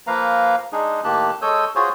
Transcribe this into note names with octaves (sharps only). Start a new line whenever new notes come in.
F3 A#3 B4 F5 A#5
G#3 D4 D#4 G#4
A2 D#3 A#3 G4 A5 F#6
G#3 A4 C#5 D#6 E6 G6
F4 F#4 G#4 C5 C#5